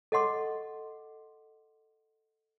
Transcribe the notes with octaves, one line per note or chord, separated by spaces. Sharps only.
A4 D#5 F#5 C6 D6